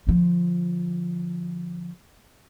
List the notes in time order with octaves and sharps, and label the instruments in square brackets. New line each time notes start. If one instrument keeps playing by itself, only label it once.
[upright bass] D3 F3